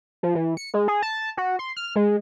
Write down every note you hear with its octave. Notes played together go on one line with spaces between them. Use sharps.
F3
E3
C#7
G#3
G#4
A5
F#4
C6
F6
G#3